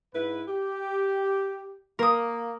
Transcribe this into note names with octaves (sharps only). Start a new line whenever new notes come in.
G#2 E4 B4
G4
A#3 A#4 D#6